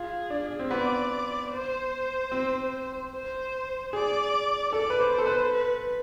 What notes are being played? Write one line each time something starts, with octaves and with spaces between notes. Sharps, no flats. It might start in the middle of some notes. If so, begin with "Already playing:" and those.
Already playing: F4 G#4
D4
C4
B3 D5
C5
C4
C5
G#4 D5
A4 D5
B4
C5
C5
A4
B4
B4